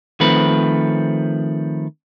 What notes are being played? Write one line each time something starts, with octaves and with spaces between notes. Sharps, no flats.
D#3 F3 A3 C4 B4